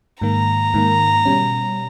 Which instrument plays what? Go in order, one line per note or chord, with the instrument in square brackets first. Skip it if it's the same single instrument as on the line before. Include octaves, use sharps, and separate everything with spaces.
[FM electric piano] G#2 D#3 A#3 [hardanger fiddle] A#5
[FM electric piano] G#2 D#3 A#3
B2 G3 C#4